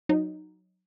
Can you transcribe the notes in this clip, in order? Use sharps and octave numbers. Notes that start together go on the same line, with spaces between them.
F#3 D#4